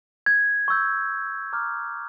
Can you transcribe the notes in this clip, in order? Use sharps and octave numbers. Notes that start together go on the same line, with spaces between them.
G#6
C#6 E6 G6
A#5 D6 F6